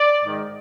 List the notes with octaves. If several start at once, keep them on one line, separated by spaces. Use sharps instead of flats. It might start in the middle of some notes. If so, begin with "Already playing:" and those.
Already playing: D5
G#2 D#3